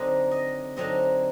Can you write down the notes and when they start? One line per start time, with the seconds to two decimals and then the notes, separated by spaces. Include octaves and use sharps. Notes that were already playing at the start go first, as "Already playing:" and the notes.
Already playing: D3 F#3 C4 D#4 D#5
0.31 D#5
0.76 D3 F#3 C4 D#4 D#5